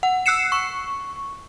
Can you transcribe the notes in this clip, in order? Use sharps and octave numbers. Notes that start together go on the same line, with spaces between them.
F#5
E6 F#6 C7 C#7 E7
C#6